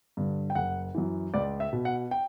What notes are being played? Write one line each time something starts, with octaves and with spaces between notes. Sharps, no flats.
G2 D3
G5
F#1 F#5
F#2 E3
C#2 D5
E5
B2
F#5
G5